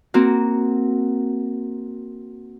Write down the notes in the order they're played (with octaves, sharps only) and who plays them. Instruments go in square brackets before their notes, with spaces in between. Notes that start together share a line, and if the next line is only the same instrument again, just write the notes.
[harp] A#3 C4 F#4